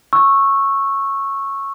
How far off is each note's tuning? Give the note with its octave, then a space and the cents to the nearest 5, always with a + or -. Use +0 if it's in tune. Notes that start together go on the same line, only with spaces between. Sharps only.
C#6 -10 E6 +0